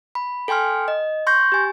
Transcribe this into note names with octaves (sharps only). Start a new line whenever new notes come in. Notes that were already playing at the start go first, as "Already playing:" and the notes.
B5
A4 G5 G#5 C6 F6
D#5
C6 C#6 G6 A#6
G4 G#5